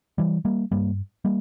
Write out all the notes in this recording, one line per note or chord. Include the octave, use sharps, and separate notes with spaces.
E3 G3
G3 A#3
G2 G3 A#3
G3 A#3